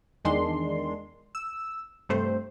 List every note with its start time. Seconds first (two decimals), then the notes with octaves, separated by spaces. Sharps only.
0.25 E2 D#3 G#3 D4 C6
1.35 E6
2.09 G2 C3 A3 C5